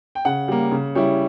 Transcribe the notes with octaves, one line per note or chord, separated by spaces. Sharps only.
G5
C#3 F#5
G3 A#3
C#3
G3 C#4 E4